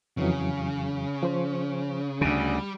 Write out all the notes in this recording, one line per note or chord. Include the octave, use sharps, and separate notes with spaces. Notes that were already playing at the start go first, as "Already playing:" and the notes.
F2 C#3 E3 F#3
F3 C5
D2 C#3 G3 D4